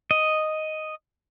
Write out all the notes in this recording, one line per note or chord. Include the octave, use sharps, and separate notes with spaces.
D#5